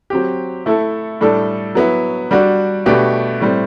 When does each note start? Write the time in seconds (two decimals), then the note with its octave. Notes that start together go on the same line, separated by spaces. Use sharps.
0.10 F#3 C4 G4
0.66 A3 E4 A4
1.21 A2 G3 D4 A4
1.75 F#3 B3 E4
2.31 G3 D4 F#4
2.86 B2 A3 D4 G4 B4
3.40 A2 G3 C4